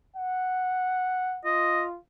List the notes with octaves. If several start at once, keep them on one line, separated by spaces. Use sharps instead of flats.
F#5
F4 D#5